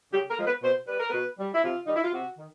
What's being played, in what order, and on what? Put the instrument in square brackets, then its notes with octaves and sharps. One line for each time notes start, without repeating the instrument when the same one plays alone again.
[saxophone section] C#3 G4
A#4
F3 G#3
B4
B2 C5
G3 B4
A#4
B2 B4
G3
E4
C3 F4
D#3 G3 D#4
E4
F4
C3 F#4
D#3